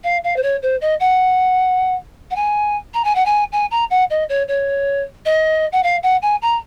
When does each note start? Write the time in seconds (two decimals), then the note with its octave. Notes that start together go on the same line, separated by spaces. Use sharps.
0.03 F5
0.24 F5
0.36 C5
0.42 C#5
0.62 C5
0.81 D#5
1.00 F#5
2.30 F#5
2.35 G#5
2.93 A#5
3.04 G#5
3.15 F#5
3.25 G#5
3.52 G#5
3.71 A#5
3.90 F#5
4.10 D#5
4.29 C#5
4.48 C#5
5.25 D#5
5.72 F#5
5.83 F5
6.03 F#5
6.22 G#5
6.42 A#5